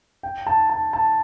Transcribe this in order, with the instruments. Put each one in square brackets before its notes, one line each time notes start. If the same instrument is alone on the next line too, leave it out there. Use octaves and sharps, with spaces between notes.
[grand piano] G5
A5
A5
A5